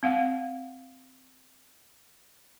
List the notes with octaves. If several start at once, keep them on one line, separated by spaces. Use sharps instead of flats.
C4 F5 F#5